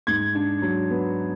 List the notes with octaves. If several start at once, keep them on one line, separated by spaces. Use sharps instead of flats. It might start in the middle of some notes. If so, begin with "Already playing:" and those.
G#2 G#6
D4
F#3
B3